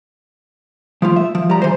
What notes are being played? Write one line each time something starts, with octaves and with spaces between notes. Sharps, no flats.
F3 A3 F4
E5
F3
G3 A#5
E3 C5